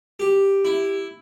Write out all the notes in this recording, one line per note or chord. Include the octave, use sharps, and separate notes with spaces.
G4
E4